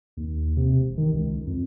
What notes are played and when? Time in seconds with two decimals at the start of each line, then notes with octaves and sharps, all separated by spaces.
0.17 D#2
0.57 C3
0.77 E1
0.97 D#3
1.13 C#2
1.47 F2